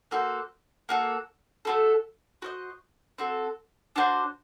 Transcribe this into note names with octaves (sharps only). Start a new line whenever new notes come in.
A#3 F#4 A4 C5
A#3 F#4 A4
A3 C4 F#4 A4
F#4 C5 D#5
C4 F#4 A4
D4 F#4 C5